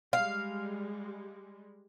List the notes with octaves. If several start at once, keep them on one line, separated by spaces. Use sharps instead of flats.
G3 G#3 F5